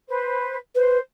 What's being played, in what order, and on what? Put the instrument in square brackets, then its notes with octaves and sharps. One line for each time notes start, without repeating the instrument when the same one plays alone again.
[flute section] B4 C5
[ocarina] B4 [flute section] C5